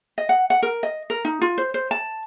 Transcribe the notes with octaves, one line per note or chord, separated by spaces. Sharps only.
D#5
F#5
F#5
A#4
D#5
A#4
D#4
F4
C5
C5
A5